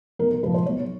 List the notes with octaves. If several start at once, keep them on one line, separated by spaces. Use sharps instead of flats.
B1 A#4
A#4
A#2 F3 G#3 B4
C5
B1 C#5